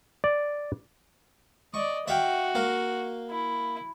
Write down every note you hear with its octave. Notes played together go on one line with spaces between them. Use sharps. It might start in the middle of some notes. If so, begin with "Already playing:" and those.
D5
D5 D#5 C#6
F#4 E5 F5 G5
A#3 F5
E4